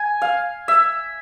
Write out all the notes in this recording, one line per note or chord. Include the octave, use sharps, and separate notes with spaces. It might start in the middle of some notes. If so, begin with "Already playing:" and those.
Already playing: G#5
F5
E5